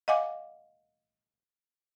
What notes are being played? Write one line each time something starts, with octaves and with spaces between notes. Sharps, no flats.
D#5 F5 F#5 G#5 D6